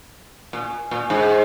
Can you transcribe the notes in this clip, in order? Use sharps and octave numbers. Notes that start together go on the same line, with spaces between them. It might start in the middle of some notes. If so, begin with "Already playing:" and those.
A#2
A#2
G#2